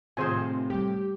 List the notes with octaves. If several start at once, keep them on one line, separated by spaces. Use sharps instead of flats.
A2 C3 D#3 C4 F4 G#4 C5 G#5
G3 A3 G4